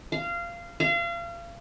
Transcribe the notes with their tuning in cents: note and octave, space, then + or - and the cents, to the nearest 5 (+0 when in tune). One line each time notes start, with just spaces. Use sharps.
F5 -20
F5 -35